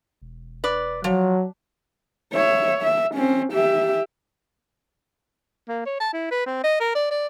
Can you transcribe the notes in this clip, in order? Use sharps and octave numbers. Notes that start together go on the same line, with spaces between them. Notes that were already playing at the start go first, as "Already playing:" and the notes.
E1
B4 D5
F3 F#3
C#5 E5
E5
C4 C#4
G4 E5
A#3
C#5
A5
E4
B4
C4
D#5
A#4
D5
D5